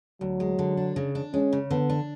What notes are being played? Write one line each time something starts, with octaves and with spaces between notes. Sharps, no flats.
D2 F#3
G#3
D3
D4
C#3
D4
G#3 C#4
C#3
D3 B3
D4